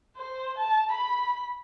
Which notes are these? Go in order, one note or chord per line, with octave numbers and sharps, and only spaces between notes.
C5
A5
B5